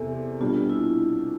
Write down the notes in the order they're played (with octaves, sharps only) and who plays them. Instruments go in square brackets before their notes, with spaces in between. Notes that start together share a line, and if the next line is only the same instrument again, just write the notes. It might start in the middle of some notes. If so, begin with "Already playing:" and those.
Already playing: [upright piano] E2 C3 [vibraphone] A4
[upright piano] B2 G3 D4 [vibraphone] F4
[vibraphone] E4